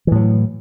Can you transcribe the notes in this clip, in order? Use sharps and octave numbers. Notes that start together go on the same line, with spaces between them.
A2 E3 F#3